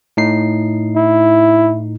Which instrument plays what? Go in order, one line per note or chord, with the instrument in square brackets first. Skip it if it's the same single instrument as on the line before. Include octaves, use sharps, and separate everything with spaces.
[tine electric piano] A2 D#4 C7
[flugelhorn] E4